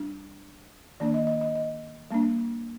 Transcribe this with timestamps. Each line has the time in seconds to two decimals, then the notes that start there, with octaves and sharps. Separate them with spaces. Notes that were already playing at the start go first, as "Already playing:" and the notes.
Already playing: G3 D4
1.00 D#3 A#3 D4 D5
1.14 D#5
1.27 D#5
1.41 D#5
1.55 D#5
2.11 G3 A#3 D4